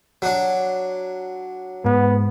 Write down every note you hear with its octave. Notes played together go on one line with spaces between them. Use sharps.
F#3 D4
G#2 B3